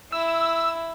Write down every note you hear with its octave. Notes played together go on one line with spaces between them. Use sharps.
E4 E6